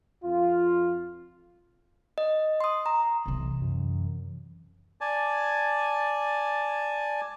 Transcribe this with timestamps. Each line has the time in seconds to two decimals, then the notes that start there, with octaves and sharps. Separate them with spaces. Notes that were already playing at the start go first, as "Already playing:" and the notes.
0.23 F2 F4
2.18 D#5
2.61 C6 D#6
2.86 A#5
3.25 B1 C3 E3
3.62 F#2
5.01 D5 G#5 A5